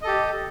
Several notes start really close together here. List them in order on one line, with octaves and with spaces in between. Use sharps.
D#5 A4 G4